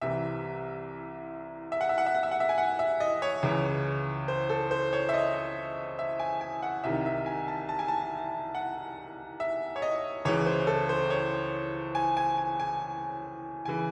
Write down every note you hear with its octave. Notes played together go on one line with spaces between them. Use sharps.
C2 C3 E3 E5
E5
F#5
E5
F#5
E5
F#5
E5
F#5
E5
G#5
F#5
E5
D#5
C#5
C#2 C#3 E3
C5
A4
C5
C#5
E5
D#5
E5
G#5
G#5
F#5
C2 C3 D#3 E5
E5
G#5
A5
A5
G#5
A5
F#5
E5
C#5
D#5
C#2 C#3 E3 C#5
C5
A4
C5
C#5
G#5
G#5
G#5
G#5
C#3 E3 G#5